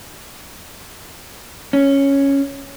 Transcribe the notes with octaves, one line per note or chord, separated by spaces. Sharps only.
C#4